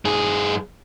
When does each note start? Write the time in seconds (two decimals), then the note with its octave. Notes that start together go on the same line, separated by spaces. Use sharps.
0.05 G2 G#4